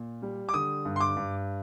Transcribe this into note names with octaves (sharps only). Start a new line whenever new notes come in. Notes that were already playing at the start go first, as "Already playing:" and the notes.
Already playing: A#2
G3
D6
D3 D#6
G2
C6
D6
G2